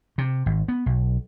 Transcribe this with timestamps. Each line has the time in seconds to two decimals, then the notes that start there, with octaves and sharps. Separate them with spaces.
0.18 C3
0.46 G#1
0.68 B3
0.86 B1